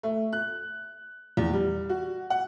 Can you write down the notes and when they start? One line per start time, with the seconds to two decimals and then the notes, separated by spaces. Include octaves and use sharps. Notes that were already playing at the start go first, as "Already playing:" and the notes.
0.03 A3
0.33 F#6
1.37 E2
1.53 G3
1.89 F#4
2.30 F#5